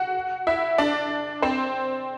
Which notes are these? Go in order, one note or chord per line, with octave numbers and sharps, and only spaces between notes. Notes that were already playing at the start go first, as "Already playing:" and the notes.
Already playing: F#4 F#5
E4 E5
D4 D5
C4 C5